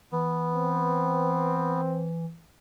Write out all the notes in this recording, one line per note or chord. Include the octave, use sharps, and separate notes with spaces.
E3 B3
C4